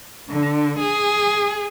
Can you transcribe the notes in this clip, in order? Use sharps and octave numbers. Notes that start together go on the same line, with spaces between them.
D3
G#4